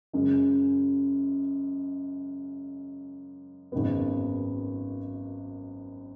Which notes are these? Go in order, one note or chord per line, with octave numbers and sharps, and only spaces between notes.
F#2 C#3 G#3
G#1 F#2 D#3 G#3 B3